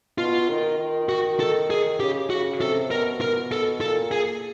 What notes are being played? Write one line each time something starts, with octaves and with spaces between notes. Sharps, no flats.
B2 F4
D#3
D#3
F#4
A4
G#4
C#3 G4
C#3 F#4
C3 A4
B2 A#4
A#4
A4
A#2 A4
G#4